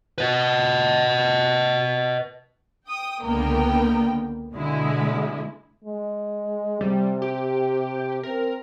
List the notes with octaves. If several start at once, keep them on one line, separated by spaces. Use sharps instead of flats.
B4 D#5
G5 D#6
C#2 D3 A#3 B3 A#4 G5
B2 D3 G#3 E4
G#3
C3 G3
G4
C4 A#4